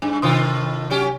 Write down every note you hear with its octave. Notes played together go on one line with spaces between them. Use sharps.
G2 D4
A2 C3 D#3 F4 C6 D#6
F#3 C#4 G4